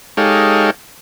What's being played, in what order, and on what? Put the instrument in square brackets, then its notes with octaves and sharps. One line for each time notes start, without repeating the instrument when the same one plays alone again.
[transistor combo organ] G#3 D#4 G4 A4 C#5 F5